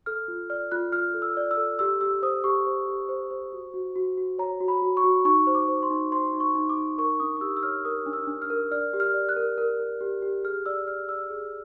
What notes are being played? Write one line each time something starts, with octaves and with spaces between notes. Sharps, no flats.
A4 F6
F4
D5 F6
F4 F#6
F4 F6
A4
E6
D5
E6
A4
G4 E6
G4 E6
C5 D#6
G4 C#6
C5
G4
C5
C5
F#4
F#4
F#4
F#4
C#5 A#5
F#4
B5
F#4
C#6
F#4
D#4 C#6
C5
D6
C5
C6
D#4
C5 C6
D#4
C#6
D#4
D6
D#4
A#4 C#6
D4 D#6
D#6
G4 E6
E6
C#5 F6
A#4 D#6
D4
E6
D4
F6
A#4
D5 F6
G4
F6
D5
F#6
A#4
A#4
A#4
G4
G4
G#4 F6
D5 E6
D5 F6
D5 E6
G#4